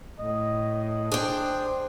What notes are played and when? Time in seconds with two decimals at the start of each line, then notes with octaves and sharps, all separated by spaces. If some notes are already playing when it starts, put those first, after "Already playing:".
0.19 A2 D#5
1.12 D4 G#4 C5 G5